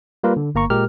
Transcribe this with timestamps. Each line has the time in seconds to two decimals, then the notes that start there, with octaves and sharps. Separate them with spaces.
0.24 G3 A#3 F4 A#4 B4
0.37 D3
0.55 G1 A#3 A#5 C#6
0.70 A#2 G#3 G4 A#4 F6